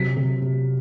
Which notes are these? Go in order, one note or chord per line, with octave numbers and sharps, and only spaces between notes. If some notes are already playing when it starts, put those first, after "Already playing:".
Already playing: C3 F#3 B6
C3
C3